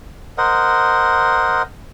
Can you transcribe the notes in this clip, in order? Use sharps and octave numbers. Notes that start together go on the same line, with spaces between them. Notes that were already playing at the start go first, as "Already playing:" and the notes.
A#4 C5 D#5 F#5